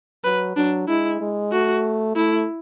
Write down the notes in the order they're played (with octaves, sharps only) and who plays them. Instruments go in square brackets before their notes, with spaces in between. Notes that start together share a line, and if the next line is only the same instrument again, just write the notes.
[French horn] F#3 [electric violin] B4
[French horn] F#3 [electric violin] D4
[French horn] G#3 [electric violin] E4
[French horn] G#3
[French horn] A3 [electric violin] F#4
[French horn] A3 [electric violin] E4